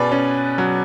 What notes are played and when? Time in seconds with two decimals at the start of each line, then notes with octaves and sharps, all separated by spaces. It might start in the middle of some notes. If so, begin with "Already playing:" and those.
Already playing: B2 C#4 G#4 B4 D5
0.12 C#4
0.58 F#3